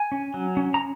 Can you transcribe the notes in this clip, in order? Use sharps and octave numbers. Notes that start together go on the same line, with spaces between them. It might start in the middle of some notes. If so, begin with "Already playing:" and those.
Already playing: G#5
C#4
F#3
C#4
A#5